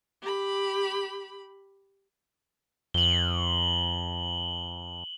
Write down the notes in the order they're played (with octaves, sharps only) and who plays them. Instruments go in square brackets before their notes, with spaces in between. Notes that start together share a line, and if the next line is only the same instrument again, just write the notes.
[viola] G4 B5
[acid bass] F2 [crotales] F#7 G7